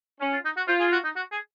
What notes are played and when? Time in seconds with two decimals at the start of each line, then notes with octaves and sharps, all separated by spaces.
0.21 C#4
0.33 F4
0.45 D#4
0.57 F#4
0.68 F4 C5
0.80 G#4
0.92 F#4
1.04 D#4
1.16 F#4
1.32 G#4